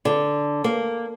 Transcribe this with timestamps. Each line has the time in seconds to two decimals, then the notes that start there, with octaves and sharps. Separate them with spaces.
0.05 D3
0.64 A#3